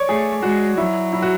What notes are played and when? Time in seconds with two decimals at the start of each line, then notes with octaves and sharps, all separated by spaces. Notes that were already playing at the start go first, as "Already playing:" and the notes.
Already playing: C#5 D5
0.08 A3 G#4
0.43 G#3 F#4
0.77 F#3 E4
1.13 E4
1.22 F#4